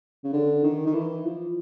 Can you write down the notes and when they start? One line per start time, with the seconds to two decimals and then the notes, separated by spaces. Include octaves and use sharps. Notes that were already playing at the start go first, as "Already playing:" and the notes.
0.24 C#3
0.33 D3
0.64 D#3
0.86 D#3
0.94 E3
1.25 F3